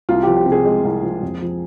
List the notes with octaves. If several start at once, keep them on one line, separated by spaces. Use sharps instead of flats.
C2 F4
F3 G4
G4
C3
G#4
G#3
C2
F3
F2
F3